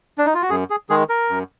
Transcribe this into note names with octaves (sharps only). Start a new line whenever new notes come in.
D4
D#4
F4
F#4
F#2 G#4
G#4
D#3 G#3 G#4
A#4
F#2